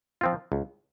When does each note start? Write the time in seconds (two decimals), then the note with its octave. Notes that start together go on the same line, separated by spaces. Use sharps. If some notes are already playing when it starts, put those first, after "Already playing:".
0.21 F3 C4 F4
0.52 C#2